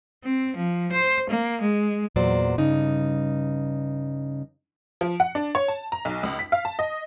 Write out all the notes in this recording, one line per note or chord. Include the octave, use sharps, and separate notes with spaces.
C4
F3
C5
A#3
G#3
E2 A#2 F#3 C5 D5
G2 C#3 D#4
F3
F#5
D4
C#5
A5
A#5
B1
C#2
B6
F5
A5
D#5